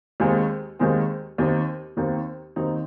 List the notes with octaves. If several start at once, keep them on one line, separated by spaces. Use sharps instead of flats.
D#2 D#3 G#3 C4
D#2 D#3 G#3 C4
D#2 D#3 C4 D#4
D#2 D#3 C4 D#4
D#2 D#3 C4 D#4